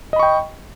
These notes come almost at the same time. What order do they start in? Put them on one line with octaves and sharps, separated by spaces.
D#5 B5 C#6 G5